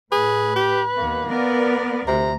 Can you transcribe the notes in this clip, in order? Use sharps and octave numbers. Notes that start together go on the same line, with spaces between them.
A2 G#4 B4
G4
D#2 A#3 B3
B3 A#4 D5
D2 C3 A#5